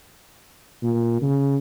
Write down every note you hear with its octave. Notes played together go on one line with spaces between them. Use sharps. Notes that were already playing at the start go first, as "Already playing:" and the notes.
A#2
C#3